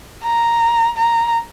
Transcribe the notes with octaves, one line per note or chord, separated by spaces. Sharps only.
A#5
A#5